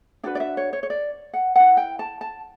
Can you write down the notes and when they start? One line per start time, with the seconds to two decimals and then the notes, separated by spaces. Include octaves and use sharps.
0.23 D4 F#4 B4 D5
0.35 D5
0.40 E5
0.57 C#5
0.73 C#5
0.83 C#5
0.90 D5
1.34 F#5
1.56 E4 B4 F#5
1.77 G5
1.99 A5
2.21 A5